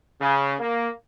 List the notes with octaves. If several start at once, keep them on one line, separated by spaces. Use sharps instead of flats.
C#3
A#3